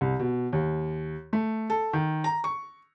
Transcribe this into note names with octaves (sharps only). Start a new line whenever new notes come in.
C2
B2
D#2
A3
A4
D#3
A#5
C#6